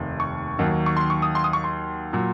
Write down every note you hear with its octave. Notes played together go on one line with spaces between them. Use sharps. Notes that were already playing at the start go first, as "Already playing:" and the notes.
Already playing: F1 D#2 D#3
C#6
D#2 D#3 F#3
C#6
C6
C#6
D#6
C6
D#6
C#6
C6
A#2 F#3